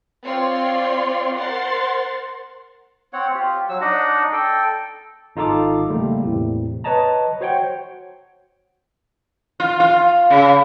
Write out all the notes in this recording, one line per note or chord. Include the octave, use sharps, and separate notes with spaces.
C4 F4 C#5 D5 C6
A#4 C5 F#5 C6 A6
C4 C#5 F#5
F4 G4
F#3 E6
D4 D#4 D#5 F#5
A4 G5
G#1 D#4 F4 A4 A#5 D6
A1 C#3 G3 A3 A#3
E2 A2 C3
B4 C#5 D#5 A5 A#5
F#4 C5 C#5 F#5 G5
F4
F4
C#3